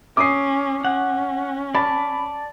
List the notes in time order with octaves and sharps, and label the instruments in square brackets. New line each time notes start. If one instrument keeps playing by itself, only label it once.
[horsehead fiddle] C#4 [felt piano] D6 D#6 C7
[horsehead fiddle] C#4 [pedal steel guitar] F#5
[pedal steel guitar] D5 A5 [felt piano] B5